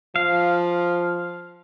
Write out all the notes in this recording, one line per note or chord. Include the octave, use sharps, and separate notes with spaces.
F3 F5